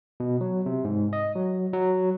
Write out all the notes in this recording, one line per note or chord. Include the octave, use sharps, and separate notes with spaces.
B2
F#3
C3
G#2
D#5
F#3
F#3